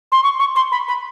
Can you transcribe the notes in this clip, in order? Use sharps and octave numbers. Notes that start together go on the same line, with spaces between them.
C6
C#6
C#6
C6
B5
B5